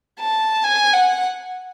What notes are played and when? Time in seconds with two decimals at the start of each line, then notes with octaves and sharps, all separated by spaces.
0.20 A5
0.64 G#5
0.93 F#5